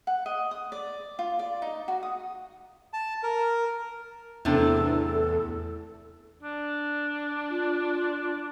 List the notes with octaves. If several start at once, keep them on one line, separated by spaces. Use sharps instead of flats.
F#5
D#5
D#6
D5
F4
D5
D#4
F#4
D#6
A5
A#4
E2 A2 C3 D4 A4
D4
F4